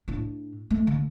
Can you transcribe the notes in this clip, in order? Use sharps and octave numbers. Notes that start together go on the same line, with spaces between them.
A2 D4
A3
D3